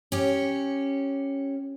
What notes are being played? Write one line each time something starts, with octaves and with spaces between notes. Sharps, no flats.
C#4 G4